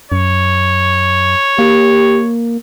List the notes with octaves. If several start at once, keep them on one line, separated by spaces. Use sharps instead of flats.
F#2 C#5
A#3 G4